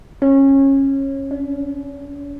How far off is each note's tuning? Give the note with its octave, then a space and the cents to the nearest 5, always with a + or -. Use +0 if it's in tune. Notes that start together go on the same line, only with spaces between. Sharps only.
C#4 -20
C#4 +45